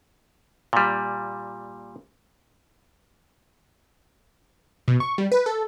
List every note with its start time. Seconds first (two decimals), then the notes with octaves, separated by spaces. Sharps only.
0.73 A#2 G3
4.88 B2
5.00 C#6
5.18 G3
5.32 B4
5.46 A4